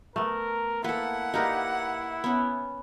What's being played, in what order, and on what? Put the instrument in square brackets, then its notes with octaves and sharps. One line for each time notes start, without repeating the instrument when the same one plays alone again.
[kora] A3 B3 [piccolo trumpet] A#4
[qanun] A#3 A4 [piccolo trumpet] E4 [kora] B4 [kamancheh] F#5
[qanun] A#3 G4 B4 [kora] D#4 A#4 D5
[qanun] B3 C#4